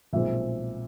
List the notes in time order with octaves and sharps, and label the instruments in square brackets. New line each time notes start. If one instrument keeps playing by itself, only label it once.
[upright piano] B1 A#2 F3 G#3 C4 E5